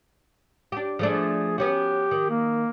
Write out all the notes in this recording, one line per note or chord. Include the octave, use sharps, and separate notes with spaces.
D4 G4
F3 A3 D4 G#4
B3 C#4 F#4 G4
D#3
A#3